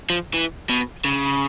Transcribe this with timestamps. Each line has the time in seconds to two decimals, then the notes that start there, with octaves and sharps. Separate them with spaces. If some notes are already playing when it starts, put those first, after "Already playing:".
0.10 F3
0.34 E3
0.69 B2
1.05 C#3